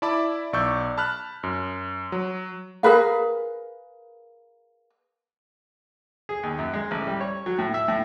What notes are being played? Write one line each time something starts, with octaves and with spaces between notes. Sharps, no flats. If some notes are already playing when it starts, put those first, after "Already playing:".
E4 D5 A5 B5 D6
B1 D5 C#6 E6 G6
A5 B5 F6 F#6
F#2
F#3
G#4 A#4 B4 F5
G#4
D#2
F#2
G#3
A1
G3
C#5
F#3
A2
E5
A2